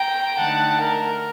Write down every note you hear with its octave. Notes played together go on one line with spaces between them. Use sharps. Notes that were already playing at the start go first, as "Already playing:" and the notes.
Already playing: G5 A#5
D3 A3 D#4 F#5 A5
A#4